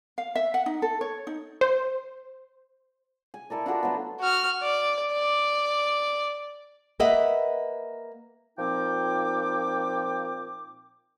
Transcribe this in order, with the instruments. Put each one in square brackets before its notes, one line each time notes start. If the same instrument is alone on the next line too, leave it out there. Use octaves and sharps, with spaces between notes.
[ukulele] F5
E5
F#5
D#4
A4
C#5
D#4
[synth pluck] C5
[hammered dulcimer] G#5
E4 A4 A#4 D5
D4 F4 F#4 A4
F#3 A3 B3
[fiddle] F#4 F6
D5
D5
[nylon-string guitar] A#3 B4 D#5 E5 F#5
[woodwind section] A#2 F3 C4 D#4 G5 D6